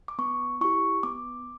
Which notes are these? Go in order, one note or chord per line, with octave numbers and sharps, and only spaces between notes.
D6
B3 C#6
E4 G4 C#6
B3 D6